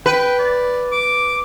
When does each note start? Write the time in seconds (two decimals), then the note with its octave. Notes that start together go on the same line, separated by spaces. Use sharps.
0.06 B4 G5
0.39 D5
0.92 D6